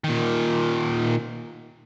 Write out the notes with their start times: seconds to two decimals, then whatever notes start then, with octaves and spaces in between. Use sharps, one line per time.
0.04 A#2 D#3